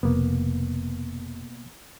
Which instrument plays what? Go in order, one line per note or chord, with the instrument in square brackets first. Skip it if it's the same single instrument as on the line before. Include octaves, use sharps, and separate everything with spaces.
[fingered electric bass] F1 [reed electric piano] B2 A#3 B3